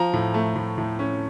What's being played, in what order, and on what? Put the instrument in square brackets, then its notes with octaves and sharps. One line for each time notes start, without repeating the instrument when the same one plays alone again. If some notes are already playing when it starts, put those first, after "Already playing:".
Already playing: [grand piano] F3 A#5
A2
A3
A2
A2
C#4